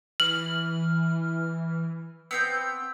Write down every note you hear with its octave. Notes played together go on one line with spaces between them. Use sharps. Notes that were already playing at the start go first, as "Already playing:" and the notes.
E3 F6 F#7
B3 C4 G5 E6